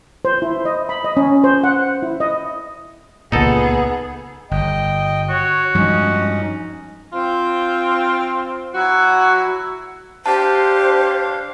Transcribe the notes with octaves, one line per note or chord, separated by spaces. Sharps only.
C5
E4
D#5
B5
D#5
C#4
C5
F#5
E4
D#5
C#2 A#2 B3 D#4 G#4 A4
G1 D#5 G5
F#4 C#5
G2 F3 G#3 C#4 D#4
C4 F4
F#3 E4 F#4
D4 G4 C5 F5 A5